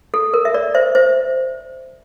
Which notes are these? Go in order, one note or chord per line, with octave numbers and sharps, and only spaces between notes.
A4
A#4
E5
A#4 D5
C5 E5
C5 E5